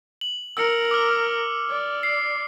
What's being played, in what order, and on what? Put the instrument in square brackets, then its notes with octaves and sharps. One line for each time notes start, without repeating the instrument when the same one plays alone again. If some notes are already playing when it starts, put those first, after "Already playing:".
[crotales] F#7
[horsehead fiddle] A#4 [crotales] E6 C#7
[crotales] D6 F6
[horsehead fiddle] D5
[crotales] C7